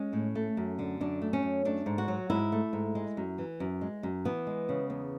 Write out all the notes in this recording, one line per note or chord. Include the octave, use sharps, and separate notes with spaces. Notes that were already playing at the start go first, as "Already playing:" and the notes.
Already playing: G#3 C#4
A2
A3
F#2
D3
F#2 D4
A3
C#4
F#2
A3 D4
G#2
F#4
F#3
G#2 E4
A3
G#2
G#3
F#2
E3
F#2
G#3
F#2
E3 B3
G#3
C#3
E2